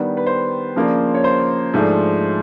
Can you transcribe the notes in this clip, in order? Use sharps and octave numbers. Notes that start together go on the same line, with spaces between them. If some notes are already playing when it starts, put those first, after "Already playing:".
Already playing: D#3 G3 B3 D4
B4
C5
C#3 F3 A#3 D4
C#5
C5
G#2 F3 A3 D4